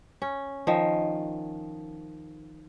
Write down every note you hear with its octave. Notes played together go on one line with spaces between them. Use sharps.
C#4
D#3 F3